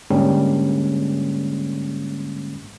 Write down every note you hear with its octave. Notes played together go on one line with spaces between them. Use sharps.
G#2 D3 G3 G#3 A#3 C#4